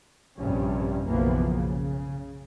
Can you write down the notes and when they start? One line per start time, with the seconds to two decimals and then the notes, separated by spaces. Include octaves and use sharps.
0.38 A#1 G2 C3 G3 C#4
1.07 F#1 B1 E3 F3 A#3 B3
1.56 C#3